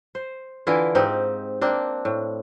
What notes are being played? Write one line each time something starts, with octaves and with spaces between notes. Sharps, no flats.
C5
D3 E3 E4 F4
G#2 C4 D#4 G4
A#3 C4 D4
A2